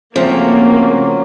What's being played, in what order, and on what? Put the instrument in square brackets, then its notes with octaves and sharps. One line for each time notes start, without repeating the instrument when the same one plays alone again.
[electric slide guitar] C#3 A3 C4 [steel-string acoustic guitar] F3 [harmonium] F#3 [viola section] A#3